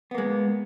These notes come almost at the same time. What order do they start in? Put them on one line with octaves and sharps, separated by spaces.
B3 A#3 G#3